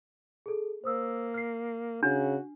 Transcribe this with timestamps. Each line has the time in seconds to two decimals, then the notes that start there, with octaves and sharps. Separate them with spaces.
0.46 G#4 A4
0.84 A#3 C5 D#6 E6
1.34 F6 C7
2.03 C#3 D4 F#4